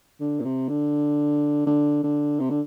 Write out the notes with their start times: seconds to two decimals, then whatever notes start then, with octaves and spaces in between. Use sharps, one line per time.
0.20 D3
0.40 A#2
0.45 C3
0.69 D3
1.66 D3
2.04 D3
2.40 C3
2.50 D3